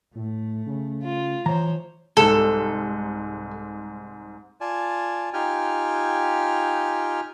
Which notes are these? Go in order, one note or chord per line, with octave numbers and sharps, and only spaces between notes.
A2 A3
C#3
F4
E3 F3 C5 C#5 A#5
C2 G#2 A4
F4 D5 G#5 A5
D#4 F4 G4 G5 G#5 F6